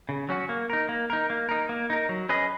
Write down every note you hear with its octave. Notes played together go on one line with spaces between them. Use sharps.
C#3
F#3 C#4 F#4
A#3
D#4 A#4
A#3
D#4 A#4
A#3
D#4 A#4
A#3
D#4 A#4
F#3
C#4 G#4 B4 D#5